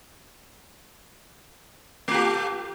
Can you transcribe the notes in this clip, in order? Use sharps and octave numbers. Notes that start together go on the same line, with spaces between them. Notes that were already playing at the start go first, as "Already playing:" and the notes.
A3 F4 G4